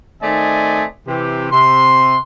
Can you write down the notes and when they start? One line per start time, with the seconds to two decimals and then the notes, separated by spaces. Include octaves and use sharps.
0.22 D#3 A3 C4 D5 D#5 G#5
1.07 C3 E3 G4
1.52 C3 C6